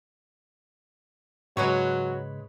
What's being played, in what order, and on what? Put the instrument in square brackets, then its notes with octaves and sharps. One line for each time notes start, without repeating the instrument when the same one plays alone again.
[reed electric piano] G#2 C#3 [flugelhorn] F#3 [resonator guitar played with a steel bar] G#3 B4 C#5